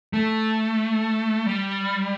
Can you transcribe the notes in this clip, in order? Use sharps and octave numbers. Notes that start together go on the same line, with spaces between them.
A3
G3